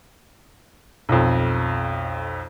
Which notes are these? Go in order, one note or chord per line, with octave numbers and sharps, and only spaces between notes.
B1 F2